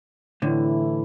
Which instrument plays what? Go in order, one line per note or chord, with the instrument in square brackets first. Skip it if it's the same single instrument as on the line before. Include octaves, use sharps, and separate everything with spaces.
[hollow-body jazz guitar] A2 D3 [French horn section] E3 A3 E4